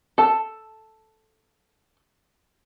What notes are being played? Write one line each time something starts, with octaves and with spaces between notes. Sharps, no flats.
A4 A5